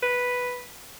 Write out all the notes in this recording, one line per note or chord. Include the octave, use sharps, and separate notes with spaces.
B4